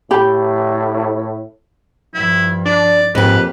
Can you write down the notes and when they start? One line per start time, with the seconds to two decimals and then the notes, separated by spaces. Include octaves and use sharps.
0.11 A2 G4 B5
2.15 G2 F3 E4
2.66 D4 D5
3.15 F2 G#2 A#3 G4 B4